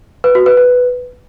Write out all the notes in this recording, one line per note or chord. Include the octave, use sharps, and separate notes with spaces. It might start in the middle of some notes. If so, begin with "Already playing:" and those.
B4
F#4
B4
B4